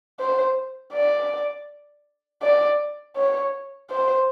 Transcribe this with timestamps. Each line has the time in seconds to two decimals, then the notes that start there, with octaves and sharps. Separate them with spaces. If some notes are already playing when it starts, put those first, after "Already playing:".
0.19 C5
0.93 D5
2.42 D5
3.16 C#5
3.90 C5